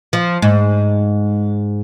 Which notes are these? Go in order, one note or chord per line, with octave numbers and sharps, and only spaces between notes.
F3
G#2